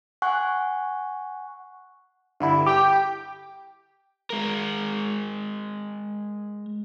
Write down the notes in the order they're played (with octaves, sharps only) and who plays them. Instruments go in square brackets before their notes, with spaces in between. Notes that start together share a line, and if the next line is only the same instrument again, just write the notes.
[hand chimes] F#5 G#5 C#6 F#6
[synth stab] G2 D3 E4
G4 G5
[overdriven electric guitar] G#3 A#4